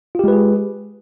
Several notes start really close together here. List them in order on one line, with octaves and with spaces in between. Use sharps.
F4 G4 G#3 B4 G#4